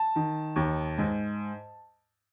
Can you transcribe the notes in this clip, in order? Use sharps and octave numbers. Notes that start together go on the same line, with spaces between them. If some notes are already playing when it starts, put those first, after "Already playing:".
Already playing: A5
D#3
D#2
G#2